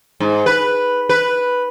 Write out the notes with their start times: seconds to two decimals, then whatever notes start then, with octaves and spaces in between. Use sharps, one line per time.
0.20 G#2
0.46 B4
1.09 B4